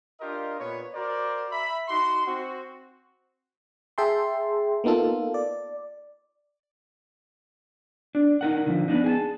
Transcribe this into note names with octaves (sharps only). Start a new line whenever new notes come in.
D4 F4 G4 A#4 D#5
A#2 B3 B4 C#5
F#4 A#4 C5 D5
E5 B5
D#4 F#4 C6
C4 F#4
G#4 E5 G5 A5 C6
A#3 B3 D#4 F4 A4
D5
D4
D#4 A#4 F#5
D3 E3 F3
B3 C4 D4 D#4
G#4 G#5 A5